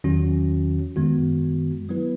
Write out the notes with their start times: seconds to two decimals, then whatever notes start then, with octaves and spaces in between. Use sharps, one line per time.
0.04 E2 D#3 F#3 C#4 F#4
0.96 F#2 D#3 G#3 B3 F#4
1.89 F#3 B3 E4 B4